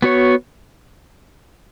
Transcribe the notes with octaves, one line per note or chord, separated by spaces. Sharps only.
B3 F#4 C#5